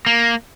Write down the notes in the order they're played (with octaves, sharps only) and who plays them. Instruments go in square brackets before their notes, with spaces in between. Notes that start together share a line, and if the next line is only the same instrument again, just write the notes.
[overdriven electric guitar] A#3